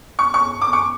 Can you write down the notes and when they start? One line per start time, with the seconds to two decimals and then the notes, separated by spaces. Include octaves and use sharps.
0.19 C#6
0.34 C#6
0.61 D6
0.73 C#6